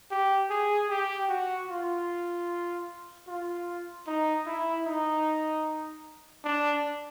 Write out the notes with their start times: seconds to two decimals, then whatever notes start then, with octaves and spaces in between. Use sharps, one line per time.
0.11 G4
0.50 G#4
0.89 G4
1.29 F#4
1.69 F4
3.28 F4
4.07 D#4
4.46 E4
4.86 D#4
6.45 D4